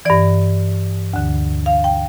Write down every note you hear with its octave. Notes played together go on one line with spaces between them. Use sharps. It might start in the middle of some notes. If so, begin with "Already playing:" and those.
G2 E3 D5
D2 D3
F5
G5